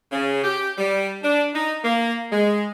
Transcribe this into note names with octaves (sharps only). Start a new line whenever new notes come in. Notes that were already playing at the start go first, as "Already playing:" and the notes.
C#3
G4
G3
D4
D#4
A#3
G#3